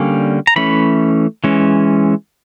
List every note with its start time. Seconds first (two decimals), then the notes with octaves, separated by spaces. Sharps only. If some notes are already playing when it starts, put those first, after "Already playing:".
Already playing: D3 G3 A#3 C#4
0.47 A#5
0.56 E3 A3 C#4 B5
1.44 E3 G#3 C#4